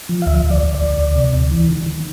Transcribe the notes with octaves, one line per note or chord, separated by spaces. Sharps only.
F3
F5
D2 E5
D2
D5
D2
D2 D5
D2
C3
D2
E3
D#3
D#3